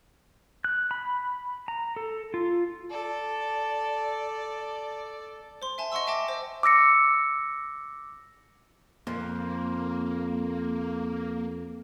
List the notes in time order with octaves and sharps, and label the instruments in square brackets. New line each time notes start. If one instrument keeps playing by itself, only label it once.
[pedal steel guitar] F#6
B5
A#5
A4
F4
[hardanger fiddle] A4 D5
[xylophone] C5 C6
E5 G#5 A5
D#5 F#5 C6 C#6 E6
E5 G5 A5 D6 A#6
C5 D#5
[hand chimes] D6 E6 A#6 C#7
[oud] F2 [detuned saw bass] A#3